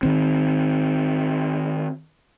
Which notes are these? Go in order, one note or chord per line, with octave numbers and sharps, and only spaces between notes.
D#3 C4